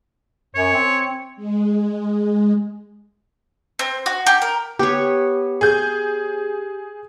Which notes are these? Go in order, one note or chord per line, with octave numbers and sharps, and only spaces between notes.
F#2 C#5
C4
G#3
C4
F#4
G4
A#4
B3 G4 C#5
G#4 G6